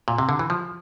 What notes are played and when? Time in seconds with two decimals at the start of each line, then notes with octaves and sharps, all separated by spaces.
0.08 A#2
0.18 C3
0.29 D3
0.39 E3
0.50 F3